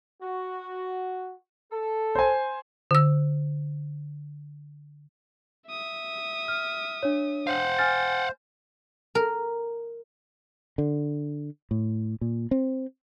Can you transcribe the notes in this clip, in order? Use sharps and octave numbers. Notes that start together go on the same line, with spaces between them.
F#4
A4
C5 G#5
D3 E6
E5 D#6
F6
D4 C#5
C5 F5 F#5
G#5 F6 A6
A#4
D3
A2
A#2
C4